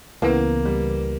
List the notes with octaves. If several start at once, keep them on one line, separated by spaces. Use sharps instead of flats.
C#2 C#3 E3 A#3 B3
G3